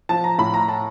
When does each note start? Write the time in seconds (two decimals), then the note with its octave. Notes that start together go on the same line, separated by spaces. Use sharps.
0.09 F3 A5
0.24 A#5
0.38 A2 B5
0.54 A#5
0.68 A5